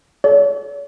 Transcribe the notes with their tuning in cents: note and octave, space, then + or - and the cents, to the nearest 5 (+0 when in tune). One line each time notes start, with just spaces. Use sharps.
A4 -40 C#5 +45